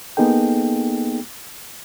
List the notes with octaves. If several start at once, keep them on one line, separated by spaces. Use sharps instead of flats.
A#3 B3 D#4 G#4 A4 G5